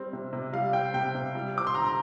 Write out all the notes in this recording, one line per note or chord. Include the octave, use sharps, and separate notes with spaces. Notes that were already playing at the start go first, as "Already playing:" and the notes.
Already playing: G3 C4
C3
C3
G3 F5
C4 G5
C3 G5
C3
G3
C4 D6
C6
D3 A#5
A#5